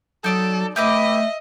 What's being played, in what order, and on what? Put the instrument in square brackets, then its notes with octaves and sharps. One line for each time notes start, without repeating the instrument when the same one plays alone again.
[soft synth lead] F#3 [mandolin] D#4 D5 D6 [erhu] A4
[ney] A3 [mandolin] G4 B4 D6 [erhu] D#5 [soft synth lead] E5